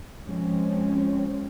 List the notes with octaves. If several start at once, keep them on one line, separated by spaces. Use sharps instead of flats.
F3 G#3 C4 C#4